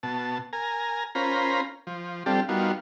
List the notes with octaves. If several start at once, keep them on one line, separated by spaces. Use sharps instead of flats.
B2 A5
A#4 G#5 A#5
C#4 F4 A#4 C5 A#5 B5
F3
G3 C4 D4 F4 G4 A4
G3 B3 D#4 F4 F#4 A#4